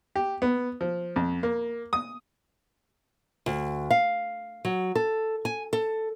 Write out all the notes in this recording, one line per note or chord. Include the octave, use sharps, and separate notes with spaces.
G4
B3
F3
F2
A#3
D#6
D2
F5
F#3
A4
G#5
A4